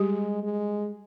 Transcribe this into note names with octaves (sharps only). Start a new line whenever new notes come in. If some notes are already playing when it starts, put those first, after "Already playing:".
Already playing: G3 G#3 G4
G#3